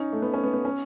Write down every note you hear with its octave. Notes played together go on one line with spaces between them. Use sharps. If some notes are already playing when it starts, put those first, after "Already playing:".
Already playing: C#4 D#4
A3
B3
C#4
B3
B3
C#4